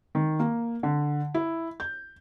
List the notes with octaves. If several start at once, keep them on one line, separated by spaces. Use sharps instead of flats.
D#3
A#3
D3
E4
G6